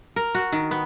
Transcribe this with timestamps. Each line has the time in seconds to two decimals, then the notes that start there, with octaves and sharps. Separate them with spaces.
0.16 A#4
0.35 F#4
0.52 D#3
0.71 B3